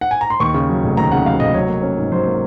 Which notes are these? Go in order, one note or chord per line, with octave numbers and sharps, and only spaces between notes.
F#5
G#5
A#5
C6
D#2 C#6
C#3
F#3
F1
D#2 A#5
C#3 F#5
F#3 F5
F1 D#5
F#3 C#5
A#3
C#4
G#2
F#3 C5
A#3